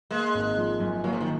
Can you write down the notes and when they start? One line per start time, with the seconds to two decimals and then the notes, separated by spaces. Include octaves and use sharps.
0.10 G#3 A#3
0.34 G#1
0.57 F3
0.80 F#2
1.04 F#3 A#3
1.13 F3
1.21 D#3